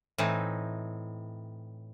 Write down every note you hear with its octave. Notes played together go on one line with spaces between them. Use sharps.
A2 E3 C4 D#4